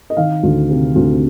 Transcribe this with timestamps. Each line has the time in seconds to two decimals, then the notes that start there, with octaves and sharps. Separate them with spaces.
0.10 D#5
0.17 D#3 F5
0.43 D2
0.69 C3
0.95 D2